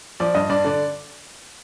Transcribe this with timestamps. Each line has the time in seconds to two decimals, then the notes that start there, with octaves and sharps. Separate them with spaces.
0.20 F3 D5
0.35 G2 D#5
0.49 G2 D5
0.65 D3 D5